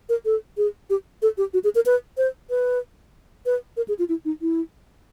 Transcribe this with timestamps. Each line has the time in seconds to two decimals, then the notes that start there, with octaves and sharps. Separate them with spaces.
0.09 A#4
0.25 A4
0.57 G#4
0.90 G4
1.22 A4
1.38 G4
1.54 F#4
1.64 G#4
1.75 A#4
1.86 B4
2.17 C5
2.50 B4
3.46 B4
3.77 A#4
3.88 G#4
3.99 F4
4.09 E4
4.25 D#4
4.41 E4